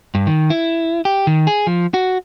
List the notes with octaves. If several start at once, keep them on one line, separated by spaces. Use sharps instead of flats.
G2
D#3
E4
G4
D#3
G#4
F3
F#4